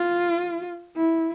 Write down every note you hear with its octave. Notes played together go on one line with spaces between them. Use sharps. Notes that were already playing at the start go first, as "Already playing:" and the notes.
Already playing: F4
E4